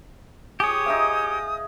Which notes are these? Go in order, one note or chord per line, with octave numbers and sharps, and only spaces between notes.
G4 G#4 C#5 D#6
D#4 E5 F5